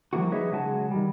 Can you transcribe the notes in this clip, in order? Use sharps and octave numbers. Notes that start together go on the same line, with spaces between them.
F3 G3 A#3 E4 F#4
D#4 G#4 B4 C#5 D#5 E5
C#3 F#3 G#3 F#4 G#5 A5
D#3 G3